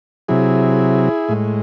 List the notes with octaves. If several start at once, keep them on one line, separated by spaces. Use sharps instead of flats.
C3 F#3 E4 G#4
A2 G#3